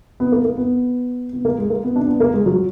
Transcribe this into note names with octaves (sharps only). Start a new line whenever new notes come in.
B3
A#3
A#3
B3
B3
A#3
G#3
A#3
B3
D4
B3
A#3
G#3
F#3